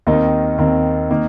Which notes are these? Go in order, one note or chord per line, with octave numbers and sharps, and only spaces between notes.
D#2 D#3 C4 D#4
D#2 D#3 C4 D#4
D#3 A#3 D#4